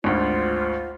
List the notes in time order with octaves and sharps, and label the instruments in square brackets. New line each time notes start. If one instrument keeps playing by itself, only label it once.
[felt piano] G#1 D2 [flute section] F4 C5